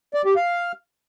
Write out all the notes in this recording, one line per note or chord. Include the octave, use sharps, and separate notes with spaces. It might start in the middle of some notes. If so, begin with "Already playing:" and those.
D5
G4
F5